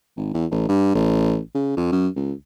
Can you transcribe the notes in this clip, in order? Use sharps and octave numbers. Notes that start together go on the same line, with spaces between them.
G#1
E2
A1
G2
A1
C#3
F2
F#2
C#2